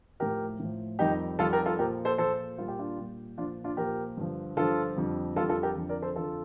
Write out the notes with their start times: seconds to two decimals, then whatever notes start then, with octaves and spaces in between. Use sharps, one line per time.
0.20 A2 F3 G4 A#4
0.59 A2 F3
0.99 F2 D#3 G3 D#4 G4
1.39 F2 D#3 G3 F4 A4
1.53 G4 A#4
1.66 F4 A4
1.79 A#2 F3 G4 A#4
2.05 A4 C5
2.18 A#2 F3 A4 C5
2.58 A#2 G3 F4
2.68 G4
2.79 D4 F4
2.98 A#2 G3
3.38 A#2 F3 D4 F4
3.64 D4 F4
3.77 A#2 F3 G4 A#4
4.17 G2 D3 F3
4.57 G2 D3 F3 F4 A4
4.96 F2 D3 G3
5.36 F2 D3 G3 F4 A4
5.49 F4 A4
5.63 G4 A#4
5.76 F2 D3 F3
5.89 A#4 D5
6.02 A4 C5
6.16 F2 D3 F3 F4 A4